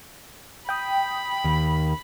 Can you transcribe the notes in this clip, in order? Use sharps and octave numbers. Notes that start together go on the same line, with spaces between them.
G5 B5 D#6
D#2 D#3